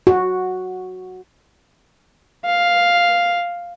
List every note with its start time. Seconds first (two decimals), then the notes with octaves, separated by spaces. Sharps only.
0.07 F#4
2.45 F5